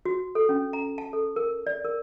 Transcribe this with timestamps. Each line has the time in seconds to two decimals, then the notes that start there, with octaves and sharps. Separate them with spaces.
0.05 F#4
0.35 A4
0.49 C#4
0.73 A#5
0.98 A5
1.13 A4
1.36 A#4
1.67 D5
1.85 A#4